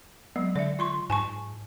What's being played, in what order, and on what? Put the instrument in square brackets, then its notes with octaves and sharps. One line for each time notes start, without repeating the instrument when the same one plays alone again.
[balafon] F#3 G#3 [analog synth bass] B3
[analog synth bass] D3 [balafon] D5 E5
[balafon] F4 C6 C#6
[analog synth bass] G#2 [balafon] G#5 A5 C#6